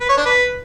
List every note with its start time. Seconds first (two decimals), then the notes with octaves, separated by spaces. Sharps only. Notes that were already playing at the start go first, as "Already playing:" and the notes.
0.01 B4
0.09 C#5
0.17 D4
0.26 B4